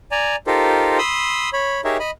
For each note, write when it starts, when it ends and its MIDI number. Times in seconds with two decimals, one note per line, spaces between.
0.11 0.36 74
0.11 0.36 80
0.11 0.36 82
0.47 0.98 63
0.47 0.98 65
0.47 0.98 67
0.47 0.98 69
0.47 0.98 70
0.47 0.98 72
0.98 1.50 83
0.98 1.50 84
0.98 1.50 87
0.98 1.50 88
1.53 1.81 73
1.53 1.81 83
1.84 1.97 63
1.84 1.97 67
1.84 1.97 68
1.84 1.97 70
1.84 1.97 73
1.84 1.97 76
2.00 2.11 75
2.00 2.11 83